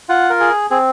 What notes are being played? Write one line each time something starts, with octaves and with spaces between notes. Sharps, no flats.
F4 F#5
A#4
G#4
C4 G#4